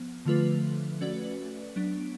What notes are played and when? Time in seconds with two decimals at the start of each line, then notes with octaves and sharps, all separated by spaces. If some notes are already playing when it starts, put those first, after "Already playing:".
Already playing: F3 B3
0.25 D3 F3 A3 F4 B4
1.01 A3 C#4 F#4 B4 D5
1.76 F#3 B3 D4